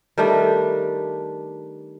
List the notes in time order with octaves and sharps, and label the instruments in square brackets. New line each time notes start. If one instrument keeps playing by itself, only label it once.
[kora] D#3 G3 A3 D4